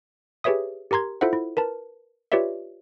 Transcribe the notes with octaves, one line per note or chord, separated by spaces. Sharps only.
G4 G#4 B4 C#5 E5 D#6
G4 A#4 A#5 C6 G#6
E4 F4 A4 C5 E5 F#5
E4
A#4 B4 A5
F4 G4 B4 C#5 D5 E5